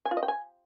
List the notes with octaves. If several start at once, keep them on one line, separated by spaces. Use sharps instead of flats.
G#5
F4
D#5
G5
G#5